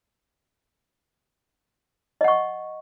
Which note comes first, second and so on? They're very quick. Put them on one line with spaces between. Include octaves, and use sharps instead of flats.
D#5 F#5 C#6